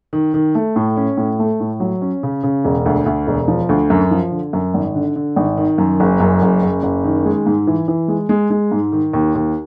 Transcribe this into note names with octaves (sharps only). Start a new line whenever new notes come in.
D#3
D#3
A3
A2
C#4
A2
A3
A2
F#3
C#4
C#3
C#3
E1
D2
D2
E1
F3
D2
F#2
F3
D3
F#2
G#1
D3
D3
G#1
D#3
F#2
F#1
F#2
F#1
F#1
F#1
D#3
G#3
G#2
E3
E3
G#3
G#3
G#3
G#2
D#3
D#2
D#2